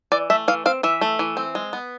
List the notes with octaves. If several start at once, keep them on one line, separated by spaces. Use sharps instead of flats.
E3 D5
A3 E5
E3 F5
C4 F5
E3 E5
A3
E3
C4
G#3
B3